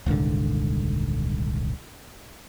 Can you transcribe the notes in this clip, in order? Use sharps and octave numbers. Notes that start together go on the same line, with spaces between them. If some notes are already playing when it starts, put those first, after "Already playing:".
D#1 C2 G#2 D3